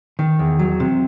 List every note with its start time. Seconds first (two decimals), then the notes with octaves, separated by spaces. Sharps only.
0.19 D#3
0.39 E2
0.59 F#3
0.80 C3